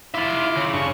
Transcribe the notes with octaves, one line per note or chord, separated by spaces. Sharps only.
E4 F4 E5 C6 D6
C#3
G2 D4 C#6